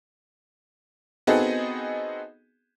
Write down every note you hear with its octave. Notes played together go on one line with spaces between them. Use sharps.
B3 C4 D#4 F#4 G#4 A4